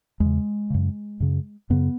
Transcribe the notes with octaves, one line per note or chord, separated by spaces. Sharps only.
E2 C#3 G#3
F#2 C#3
F#2 C#3
F#2 C#3 B3